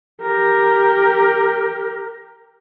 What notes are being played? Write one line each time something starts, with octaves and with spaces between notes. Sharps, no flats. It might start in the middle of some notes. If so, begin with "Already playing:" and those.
G4 A#4